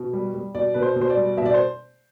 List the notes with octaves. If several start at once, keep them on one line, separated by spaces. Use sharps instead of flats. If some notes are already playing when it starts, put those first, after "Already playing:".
Already playing: B2
G3
G3
B2 D5
B2 B4
C5
B2
C5
D5
G3
B2 E5
D5
C5